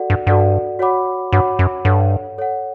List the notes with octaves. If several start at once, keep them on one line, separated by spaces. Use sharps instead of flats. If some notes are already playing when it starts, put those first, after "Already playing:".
Already playing: F#4 A4 D5 F#5
G2
G2 F#4 A4 D5 F#5
F#4 C#5 F#5 B5 D6
G2 F#4 C#5 F#5 B5 D6
F#2
G2 A4 C#5 F#5
A4 C#5 F#5